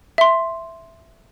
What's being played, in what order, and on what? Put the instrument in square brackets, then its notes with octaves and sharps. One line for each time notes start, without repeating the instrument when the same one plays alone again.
[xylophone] E5 C6